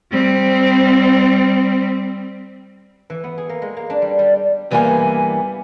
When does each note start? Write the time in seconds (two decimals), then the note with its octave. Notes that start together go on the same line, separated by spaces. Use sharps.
0.12 G3 C4
3.10 E3
3.24 B3
3.38 G#4
3.49 A#3
3.62 G#3
3.77 A#3
3.90 D4
4.02 G3
4.19 G3
4.71 G2 E3 G3 A#3 B3 G#5